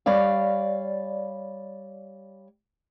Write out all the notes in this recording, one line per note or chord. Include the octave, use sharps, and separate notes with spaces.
G3 C#5 D5 F5